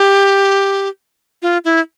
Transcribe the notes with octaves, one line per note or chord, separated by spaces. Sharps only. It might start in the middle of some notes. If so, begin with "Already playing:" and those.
Already playing: G4
F4
E4